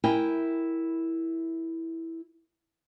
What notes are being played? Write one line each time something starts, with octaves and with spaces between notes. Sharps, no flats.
E4 A#4 G5 G#5